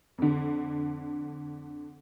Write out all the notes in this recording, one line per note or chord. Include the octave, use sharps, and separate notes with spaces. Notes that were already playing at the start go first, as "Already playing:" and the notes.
F2 D3